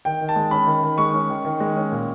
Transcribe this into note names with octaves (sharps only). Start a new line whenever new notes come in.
D#3 G5
D#3
A5
G#3
C#4 B5
D#3
D#3
G#3 C#6
C#4
D#3
D#3
G#3
C#4
A#2